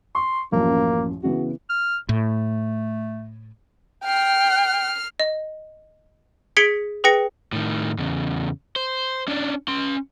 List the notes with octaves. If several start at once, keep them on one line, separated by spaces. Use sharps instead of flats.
C6 C#6
A1 F#2 F3 A#3
C#3 E3 B3 F#4
F6
A2 A3
G5 F6 C7
D#5
G#4 G#6 B6 C#7 D7 G7
G#4 B4 G5 A#6 C#7
A2 D#3
E2 C#3
C5
C#4 D4
C#4 C6